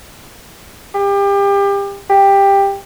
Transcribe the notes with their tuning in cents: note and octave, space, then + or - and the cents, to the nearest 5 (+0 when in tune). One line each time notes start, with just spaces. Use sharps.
G4 +30
G4 +15